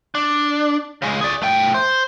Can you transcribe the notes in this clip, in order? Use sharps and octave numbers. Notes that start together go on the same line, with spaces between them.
D4
C#3 G#3
G#4 D5
A3 G5
C5